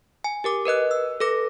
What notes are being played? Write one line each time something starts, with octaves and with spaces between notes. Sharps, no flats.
G#5
G4 A#4 D6
A#4 B4 D#5 F#6
E6
A4 B4 D6 A#6